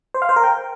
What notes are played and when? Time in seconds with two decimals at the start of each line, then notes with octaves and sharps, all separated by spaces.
0.14 C5
0.22 F5
0.29 C5
0.36 A#4
0.44 G5